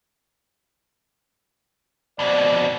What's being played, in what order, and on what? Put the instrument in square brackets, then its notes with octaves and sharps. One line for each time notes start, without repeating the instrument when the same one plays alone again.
[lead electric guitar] F2 B2 [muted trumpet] D5